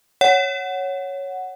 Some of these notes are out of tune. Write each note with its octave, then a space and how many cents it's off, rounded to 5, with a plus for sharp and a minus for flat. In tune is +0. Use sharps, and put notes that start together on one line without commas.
C#5 +0 F#5 +0